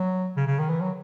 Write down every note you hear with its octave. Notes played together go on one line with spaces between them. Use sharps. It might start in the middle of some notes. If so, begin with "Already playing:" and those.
Already playing: F#3
C#3
C#3
D#3
E3
F#3